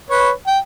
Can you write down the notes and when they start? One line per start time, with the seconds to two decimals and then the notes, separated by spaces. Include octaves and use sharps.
0.10 B4 C#5
0.47 G5